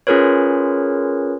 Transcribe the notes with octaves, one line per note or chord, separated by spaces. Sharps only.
C#4 F4 G#4 A#4 B4 C#5